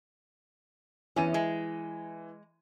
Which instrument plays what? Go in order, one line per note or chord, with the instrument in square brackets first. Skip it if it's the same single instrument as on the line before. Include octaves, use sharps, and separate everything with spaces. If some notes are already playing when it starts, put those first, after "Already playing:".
[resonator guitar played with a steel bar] E2 C#4 [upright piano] E3 D#7
[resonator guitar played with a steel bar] G#3